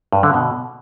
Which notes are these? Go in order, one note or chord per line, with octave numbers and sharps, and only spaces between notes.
G2
D3
B2